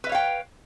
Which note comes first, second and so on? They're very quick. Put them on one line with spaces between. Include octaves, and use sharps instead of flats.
B4 E5 C#5 F5 G5